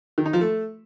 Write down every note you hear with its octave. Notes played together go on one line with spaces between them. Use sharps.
D#3
D#4
F3
A3